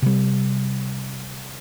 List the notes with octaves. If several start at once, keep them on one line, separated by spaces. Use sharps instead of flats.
C3 G3